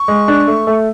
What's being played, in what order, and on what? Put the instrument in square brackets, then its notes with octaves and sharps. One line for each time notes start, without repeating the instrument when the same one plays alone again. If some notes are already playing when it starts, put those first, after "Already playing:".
Already playing: [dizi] C#6
[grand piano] G#3
D4
A3
A3